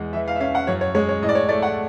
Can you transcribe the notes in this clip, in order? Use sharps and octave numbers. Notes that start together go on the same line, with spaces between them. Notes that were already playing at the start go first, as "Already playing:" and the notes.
Already playing: E2 G#3
E3 E5
F5
E5
C#4 F5
F#5
F#2 C#5
C#5
G#3 C#5
C#5
A2 D#5
D5
C#5
A3 D5
F#5